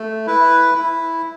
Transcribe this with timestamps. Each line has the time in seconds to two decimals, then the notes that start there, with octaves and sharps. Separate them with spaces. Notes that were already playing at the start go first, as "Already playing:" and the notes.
Already playing: A3
0.27 E4 B4
0.75 E4